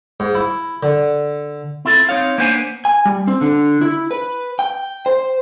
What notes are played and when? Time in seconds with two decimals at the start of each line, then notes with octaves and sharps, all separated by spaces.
0.20 G#2
0.35 E4
0.83 D3
1.85 C4 E4 F4 A4
2.09 C4 D#4 C#5 F5
2.38 A#3 B3 D4 C5 F#5 G#5
2.85 G#5
3.05 G3
3.27 C4
3.41 D3
3.81 E4
4.11 B4
4.59 G5
5.06 C5